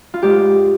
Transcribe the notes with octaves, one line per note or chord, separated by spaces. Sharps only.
F4
G#2 G4